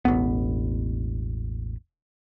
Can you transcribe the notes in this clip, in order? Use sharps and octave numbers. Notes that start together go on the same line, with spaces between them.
E1 A1 F2 B3